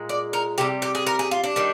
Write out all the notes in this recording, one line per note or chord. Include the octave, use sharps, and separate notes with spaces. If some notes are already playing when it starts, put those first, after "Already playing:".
Already playing: A#2 G#3
D5
A#4
C3 G3 G4
G4
G#4
A#4
G#4
F4
D4
D#3 G3